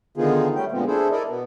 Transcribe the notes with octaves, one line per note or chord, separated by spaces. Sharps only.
D3 D#3 B3 D#4 F4 G#4
G3 A3 C#4 G5
A#2 D3 F3 G#3 B3 C4
D4 E4 G#4 A4 C5
E4 A4 A#4 D5 D#5
B2 B3